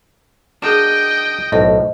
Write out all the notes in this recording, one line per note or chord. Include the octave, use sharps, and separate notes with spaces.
D4 F#4 G#4 A#4 D#5 G5 E7
B1 A2 C5 D#5